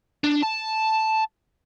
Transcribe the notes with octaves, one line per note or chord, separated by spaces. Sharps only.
D4
A5